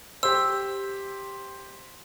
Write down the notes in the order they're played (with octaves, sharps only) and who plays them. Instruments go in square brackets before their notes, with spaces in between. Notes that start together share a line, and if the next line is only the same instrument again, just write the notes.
[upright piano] G4 C5 [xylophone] E6